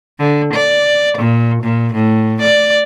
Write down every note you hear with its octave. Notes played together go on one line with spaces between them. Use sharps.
D3
D5
A#2
A#2
A2
D5